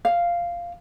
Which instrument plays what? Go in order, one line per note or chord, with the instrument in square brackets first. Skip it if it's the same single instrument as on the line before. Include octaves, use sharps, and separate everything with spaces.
[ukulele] F5